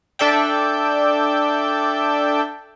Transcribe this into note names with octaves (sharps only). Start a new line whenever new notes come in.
D4 A4 D5 E5 G5